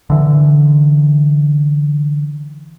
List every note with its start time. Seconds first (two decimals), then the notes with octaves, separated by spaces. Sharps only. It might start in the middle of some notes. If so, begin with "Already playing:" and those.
0.10 D3 E3